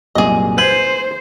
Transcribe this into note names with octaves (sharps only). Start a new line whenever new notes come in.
C2 F#2 A#2 G#4 D#5
B4 C5 G6 G#6